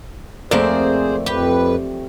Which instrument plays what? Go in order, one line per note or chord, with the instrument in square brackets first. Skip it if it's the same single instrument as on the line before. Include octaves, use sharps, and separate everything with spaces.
[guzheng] F2 A#3 [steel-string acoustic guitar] A3 C4 D5 [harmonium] G#4 C5
[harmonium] F2 B4 [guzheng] G4